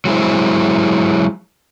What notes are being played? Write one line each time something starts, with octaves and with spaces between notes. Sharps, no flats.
F#3 G#3 E4 C5